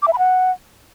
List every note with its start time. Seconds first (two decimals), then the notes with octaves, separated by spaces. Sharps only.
0.02 D6
0.08 E5
0.13 B5
0.19 F#5